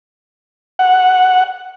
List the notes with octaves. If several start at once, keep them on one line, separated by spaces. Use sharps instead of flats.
F#5